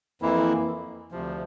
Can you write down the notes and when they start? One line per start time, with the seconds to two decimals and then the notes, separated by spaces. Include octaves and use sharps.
0.22 F2 E3 A#3 E4
1.12 D2 C3 F3